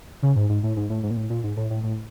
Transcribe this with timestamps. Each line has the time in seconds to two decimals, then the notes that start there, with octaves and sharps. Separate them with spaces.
0.23 C#3
0.36 G#2
0.49 G#2
0.63 A2
0.77 G#2
0.90 A2
1.03 G#2
1.11 A#2
1.17 A2
1.30 A#2
1.43 G#2
1.57 A2
1.70 A2
1.83 A2